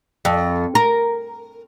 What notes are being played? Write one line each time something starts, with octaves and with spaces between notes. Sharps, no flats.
F2
A#4